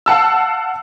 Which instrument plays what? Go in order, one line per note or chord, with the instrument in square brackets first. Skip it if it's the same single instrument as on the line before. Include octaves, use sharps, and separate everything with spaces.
[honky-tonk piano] F5 F#5 A5 E6